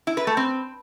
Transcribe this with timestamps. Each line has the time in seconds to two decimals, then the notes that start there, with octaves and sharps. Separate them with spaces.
0.07 E4
0.17 B4
0.27 A3
0.37 C4